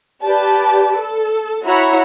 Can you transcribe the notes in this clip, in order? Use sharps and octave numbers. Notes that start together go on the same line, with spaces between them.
G4 B4 D5 A5
A4
E4 F#4 C#5 F#5 A#5 B5